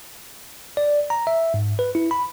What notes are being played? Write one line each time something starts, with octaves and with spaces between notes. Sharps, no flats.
D5
A#5
E5
G#2
B4
E4
B5